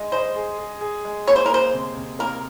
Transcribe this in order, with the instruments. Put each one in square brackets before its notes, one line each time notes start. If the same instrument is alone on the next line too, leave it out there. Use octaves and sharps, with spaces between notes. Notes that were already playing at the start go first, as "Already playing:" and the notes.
Already playing: [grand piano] G#3 D#4 D#5
[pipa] C5 [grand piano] D#5
[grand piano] G#4
G#4
G#4
G#3
[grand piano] A#3 [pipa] C#5
[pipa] C5
A#4
[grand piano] A#3 [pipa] C5
[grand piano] C3
C3
[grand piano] A#3 [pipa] A#4